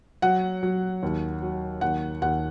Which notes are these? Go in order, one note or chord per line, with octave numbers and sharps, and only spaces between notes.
F#3 F#5
F#3
D#2
F#3
D#2 F#5
D#2 F#5